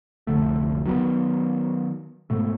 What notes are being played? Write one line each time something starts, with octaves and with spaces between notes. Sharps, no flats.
F1 C2 D3 A3
D#3 F#3 G#3 B3
G#2 B2 A3